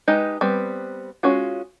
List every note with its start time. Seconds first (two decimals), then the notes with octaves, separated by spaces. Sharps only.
0.08 G#3 D#4 G4 B4 D#5
0.41 G3 B3 C4
1.23 G#3 C#4 F4 F#4